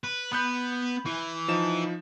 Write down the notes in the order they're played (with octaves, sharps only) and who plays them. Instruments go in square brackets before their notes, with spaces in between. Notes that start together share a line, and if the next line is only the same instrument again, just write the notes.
[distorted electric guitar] B4
[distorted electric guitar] B3 [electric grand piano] B5 F#6 G6
[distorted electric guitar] E3
[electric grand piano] F3 D#4 E7